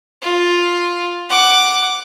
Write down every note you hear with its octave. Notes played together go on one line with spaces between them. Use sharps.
F4
F#5 D6